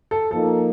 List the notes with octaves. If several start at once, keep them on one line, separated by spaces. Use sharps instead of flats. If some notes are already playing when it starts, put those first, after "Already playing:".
A4
F3 A#3 D#4 A4